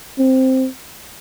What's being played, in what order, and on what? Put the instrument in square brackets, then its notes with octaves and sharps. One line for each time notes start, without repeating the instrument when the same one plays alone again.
[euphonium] C4